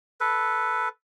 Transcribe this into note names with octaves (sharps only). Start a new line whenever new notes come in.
A4 B4